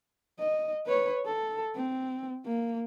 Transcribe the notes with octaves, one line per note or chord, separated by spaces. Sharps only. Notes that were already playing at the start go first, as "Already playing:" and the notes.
D#5
B4 C#5
A4
C4
A#3